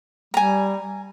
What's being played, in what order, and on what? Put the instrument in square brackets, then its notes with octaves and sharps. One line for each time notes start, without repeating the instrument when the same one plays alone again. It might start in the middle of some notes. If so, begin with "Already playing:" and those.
[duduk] G3 [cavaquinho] G#5 A#5